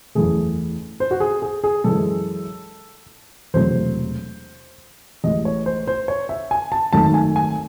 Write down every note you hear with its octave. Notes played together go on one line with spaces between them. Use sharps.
F#1 E2 C#3 E3 A3 G#4
C5
F#4
G#4
G#4
G#4
F#2 C#3 E3 G#3 A4
E1 E2 C3 F#3 A3 C5
A1 A2 G#3 D#5
C#5
C5
C5
C#5
E5
G#5
A5
G#1 F#2 D#3 F#3 A3 A5
G#5
G#5